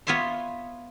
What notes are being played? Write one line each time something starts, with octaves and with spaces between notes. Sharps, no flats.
B3 F4 C#5 E5 C6